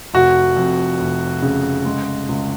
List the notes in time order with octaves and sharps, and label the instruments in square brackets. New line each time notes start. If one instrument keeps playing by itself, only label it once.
[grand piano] F1 F#4
F2
F1
C#3
G#3
C#2